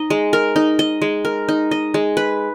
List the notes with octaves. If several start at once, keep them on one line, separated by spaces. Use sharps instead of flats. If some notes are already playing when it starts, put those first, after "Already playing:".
Already playing: D#4 D#5
G#3
A#4
D#4
D#5
G#3
A#4
D#4
D#5
G#3
B4